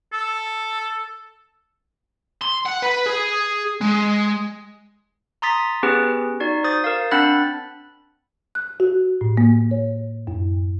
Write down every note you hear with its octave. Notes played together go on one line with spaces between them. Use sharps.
A4
C6
F#5
B4
G#4
G#3
A#5 C6 D#6 A6 B6
B3 C#4 G4 G#4 B4
D#4 F#4 D5
C5 D#6 A6
A#4 F5
C4 D4 F#5 B5 F#6 A6
F#6
F#4
A2
A#3
C#5
F#2